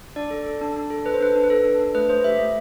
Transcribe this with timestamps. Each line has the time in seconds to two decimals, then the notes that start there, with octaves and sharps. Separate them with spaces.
0.16 D4 D5
0.31 A4
0.46 A4
0.61 D4
0.76 D4
0.90 A4
1.05 A4 B4
1.14 C5
1.21 D4 B4
1.35 D4
1.44 B4
1.49 D4 A4
1.65 D4
1.79 D4
1.95 A3 B4
2.09 A3 C5
2.24 G4 E5
2.39 A3